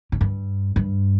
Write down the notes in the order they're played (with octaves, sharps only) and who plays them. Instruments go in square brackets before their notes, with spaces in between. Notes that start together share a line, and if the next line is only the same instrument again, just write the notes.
[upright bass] A2
G2
G2